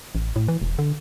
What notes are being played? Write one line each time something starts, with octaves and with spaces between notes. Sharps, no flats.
A1
A2
E3
E1
D3